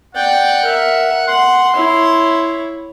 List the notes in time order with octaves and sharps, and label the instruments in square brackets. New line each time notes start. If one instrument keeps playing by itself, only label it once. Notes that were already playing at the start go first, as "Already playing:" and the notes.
[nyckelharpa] D5 G5 [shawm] F#5
[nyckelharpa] A#4 E5
[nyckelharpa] F#5 [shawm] C6
[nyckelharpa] E4 C#5